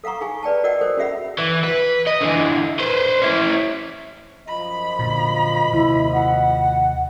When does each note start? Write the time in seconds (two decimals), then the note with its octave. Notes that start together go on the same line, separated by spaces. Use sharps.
0.04 A4 F5 F#5 A#5 C#6
0.21 D#4 G#4 F5 G#5 C#6
0.43 B4 D5 G5 A5
0.64 F#4 A#4 D5 D#5 F#5 G5
0.81 A4 A#4 C5
0.97 C#4 F#4 G#4 E5 F#5 B5
1.38 E3
1.64 B4
2.07 D#5
2.21 D3 E3
2.79 B4 C5
3.22 C#4 E4
4.48 F#2 F3 D#5 B5
4.99 A#2 D3
5.73 D#2 C3 D#3 E4
6.13 F#5